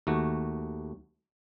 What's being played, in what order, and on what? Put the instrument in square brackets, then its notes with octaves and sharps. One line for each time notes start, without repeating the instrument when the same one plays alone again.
[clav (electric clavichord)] D#2 A3 F#4